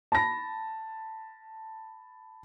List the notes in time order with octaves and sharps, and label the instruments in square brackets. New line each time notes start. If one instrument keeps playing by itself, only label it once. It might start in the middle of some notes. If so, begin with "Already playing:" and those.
[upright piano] A5 B5 A#6